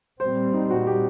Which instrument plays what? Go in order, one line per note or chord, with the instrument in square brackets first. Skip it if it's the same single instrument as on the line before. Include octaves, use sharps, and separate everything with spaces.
[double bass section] A#2 G3 C4 [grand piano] C5
[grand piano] D#4
F#4
G4